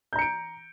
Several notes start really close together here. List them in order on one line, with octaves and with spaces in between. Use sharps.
G6 A#5 C#7 D7